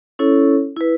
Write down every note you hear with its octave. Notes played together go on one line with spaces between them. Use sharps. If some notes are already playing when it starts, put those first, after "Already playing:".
C#4 E4 A4 C#5
E4 B4